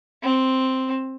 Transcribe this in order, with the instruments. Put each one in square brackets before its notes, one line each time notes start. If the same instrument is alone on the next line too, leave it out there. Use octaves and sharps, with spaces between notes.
[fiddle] C4